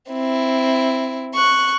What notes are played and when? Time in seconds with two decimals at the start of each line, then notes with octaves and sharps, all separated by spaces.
0.11 C4 E4
1.35 C#6 F#6